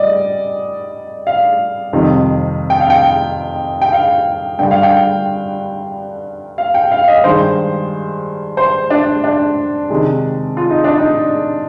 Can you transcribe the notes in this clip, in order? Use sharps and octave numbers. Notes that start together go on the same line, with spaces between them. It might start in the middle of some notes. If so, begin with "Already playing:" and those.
Already playing: G3 D5 D#5
F5
F2 C3 D#3 G3
G5
F5
G5
G5
F5
G2 D3 G3 G5
F5
G5
F5
G5
F5
D#5
G2 D#3 G#3 C5
C5
D4
D4
C3 D#3 G#3
F4
D#4
D4
D#4